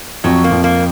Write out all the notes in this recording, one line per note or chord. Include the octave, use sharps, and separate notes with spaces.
F2 F#3
A#3
F2
A#3